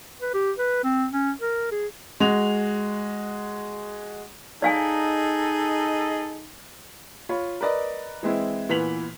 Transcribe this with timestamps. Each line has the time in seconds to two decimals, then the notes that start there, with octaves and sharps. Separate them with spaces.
0.21 B4
0.34 G4
0.58 B4
0.84 C4
1.12 C#4
1.41 A#4
1.72 G#4
2.20 G#3 F#4 F7
4.62 D#4 G#4 A4 D5 D#5 F5 G#5
7.29 F4 C#5 B5
7.61 A#4 B4 D5 D#5
8.23 E3 G#3 C4 E4
8.69 A#2 E3 B3 B6 F7 F#7